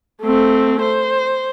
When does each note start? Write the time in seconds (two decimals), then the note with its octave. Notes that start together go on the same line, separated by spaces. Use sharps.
0.23 A3 C4
0.81 C5